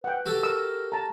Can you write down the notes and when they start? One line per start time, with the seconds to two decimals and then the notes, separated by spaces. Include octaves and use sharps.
0.04 B4 F#5 G5
0.26 F#4 G4 A4
0.43 A#4 E6
0.92 A5 A#5